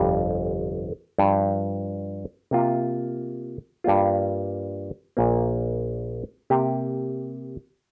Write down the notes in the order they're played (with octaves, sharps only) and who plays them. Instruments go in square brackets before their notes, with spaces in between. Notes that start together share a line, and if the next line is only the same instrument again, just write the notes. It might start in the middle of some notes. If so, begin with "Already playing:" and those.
Already playing: [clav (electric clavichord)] G1 F2 C3 G3
G2 F3 D4 G4
C3 A#3 F4
G2 G3 A#3 F4
A#1 A#2 A#3
C3 A#3 G4